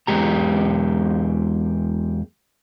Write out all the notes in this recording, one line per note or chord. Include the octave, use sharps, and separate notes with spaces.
E2 G2 G#3 G4 A#5